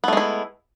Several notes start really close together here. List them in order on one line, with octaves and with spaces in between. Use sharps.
B3 A3 G#3 E4